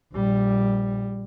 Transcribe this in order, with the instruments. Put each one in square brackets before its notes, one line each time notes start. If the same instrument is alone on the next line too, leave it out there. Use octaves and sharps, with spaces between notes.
[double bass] A#1 G3